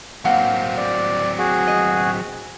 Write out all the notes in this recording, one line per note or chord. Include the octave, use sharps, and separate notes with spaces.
F#3 A#3 C4 F5 F#5
D5
F#4 G#4
D#5